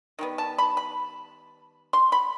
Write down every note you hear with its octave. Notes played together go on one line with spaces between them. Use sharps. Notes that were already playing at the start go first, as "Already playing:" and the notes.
D#3 G3 B3
A5
B5
B5
C6
B5